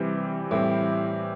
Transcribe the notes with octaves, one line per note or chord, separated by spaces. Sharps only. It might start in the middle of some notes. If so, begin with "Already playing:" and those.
Already playing: C3 E3 G3 C4 G4
A2 E3 G3 C4 G4